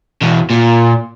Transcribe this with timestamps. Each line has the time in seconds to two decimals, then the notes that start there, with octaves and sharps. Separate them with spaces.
0.21 E2 B2
0.50 A#2